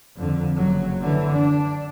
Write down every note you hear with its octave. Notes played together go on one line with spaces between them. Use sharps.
F2 D3
F#1 F#3
D3 E3
D4